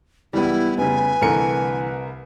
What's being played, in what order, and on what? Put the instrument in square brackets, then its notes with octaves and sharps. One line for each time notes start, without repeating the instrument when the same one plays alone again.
[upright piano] C#2 E3 [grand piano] G3 B3 [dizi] E4
[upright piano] F1 C#3 [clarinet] B4 [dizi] G#5
[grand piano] C2 A#4 C#7 [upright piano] D3 E3 A3